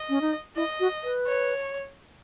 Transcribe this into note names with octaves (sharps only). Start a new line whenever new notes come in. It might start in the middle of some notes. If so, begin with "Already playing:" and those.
Already playing: D#5
C#4
D#4
E4 D#5
F#4
B4
C#5